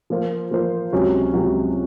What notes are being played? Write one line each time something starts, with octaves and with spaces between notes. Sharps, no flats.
F3 A#3 F4 C5
F3 A#3 F4 C5
C#2 C3 F#3 C#4 F#4
C#2 C3 F#3 C#4 F#4